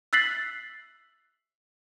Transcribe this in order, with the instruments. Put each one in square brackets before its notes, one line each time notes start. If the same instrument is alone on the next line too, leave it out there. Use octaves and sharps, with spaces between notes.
[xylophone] E6 F#6 A6 B6 C7 F#7